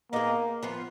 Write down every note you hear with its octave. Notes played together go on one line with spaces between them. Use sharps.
A#3 B3 D#4 G#4
F3 B3 F4